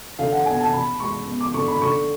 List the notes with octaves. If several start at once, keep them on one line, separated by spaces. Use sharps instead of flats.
D3 F5
F#5
B3 G#5
A5
B2 B5
G#3 C#6
B3
D6
D3 C#6
B5
D3 C#6